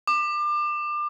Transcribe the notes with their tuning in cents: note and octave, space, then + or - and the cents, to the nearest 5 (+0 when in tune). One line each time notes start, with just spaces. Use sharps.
D6 +30